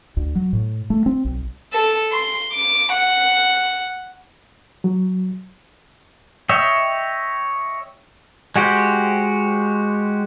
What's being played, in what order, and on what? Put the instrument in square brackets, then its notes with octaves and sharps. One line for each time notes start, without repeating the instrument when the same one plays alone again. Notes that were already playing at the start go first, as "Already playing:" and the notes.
[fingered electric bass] D2
F#3
A2
A3
C4
B1
[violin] A4
C6
D6
F#5
[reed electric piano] F#3
[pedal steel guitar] C#5 D#5 E5 G5
G#3 F#4 G4 C5